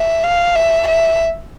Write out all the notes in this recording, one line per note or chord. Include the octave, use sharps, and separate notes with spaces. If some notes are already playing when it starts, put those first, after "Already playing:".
Already playing: E5
F5
E5
E5